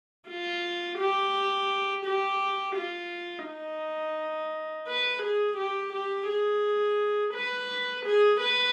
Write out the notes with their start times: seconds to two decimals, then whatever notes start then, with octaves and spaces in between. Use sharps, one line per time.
0.28 F4
0.98 G4
2.05 G4
2.76 F4
3.46 D#4
4.88 B4
5.22 G#4
5.57 G4
5.93 G4
6.28 G#4
7.34 B4
8.06 G#4
8.40 B4